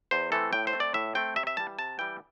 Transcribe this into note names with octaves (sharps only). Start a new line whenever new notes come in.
E2 C5
E3 A3 C4 A4
A2 G5
C5
A3 C4
D5
A2 E5
A3 C4 G5
C3 E5
E5
E3 G3 A5
C3 A5
E3 G3 G5